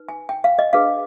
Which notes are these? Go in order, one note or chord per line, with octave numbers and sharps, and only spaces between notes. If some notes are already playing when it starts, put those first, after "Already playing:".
Already playing: D#4 B4
G#5
G5
F5
D#5
D4 G#4 B4 F5